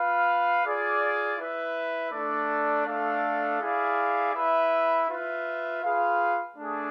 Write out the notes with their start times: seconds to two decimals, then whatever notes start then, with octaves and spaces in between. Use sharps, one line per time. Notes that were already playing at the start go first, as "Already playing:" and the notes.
Already playing: F4 B4 F5
0.63 F4 G#4 D5
1.37 E4 B4 E5
2.11 A3 D4 A4 D5
2.86 A3 D4 A4 D5 F5
3.60 E4 G#4 D5 F5
4.34 E4 B4 E5
5.08 F4 B4 E5
5.82 F4 G#4 B4 F5
6.57 A3 D4 G#4